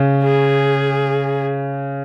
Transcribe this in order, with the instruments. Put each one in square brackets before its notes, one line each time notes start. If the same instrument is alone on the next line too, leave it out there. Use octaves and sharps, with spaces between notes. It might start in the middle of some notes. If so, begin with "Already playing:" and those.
Already playing: [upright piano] C#3
[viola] G#4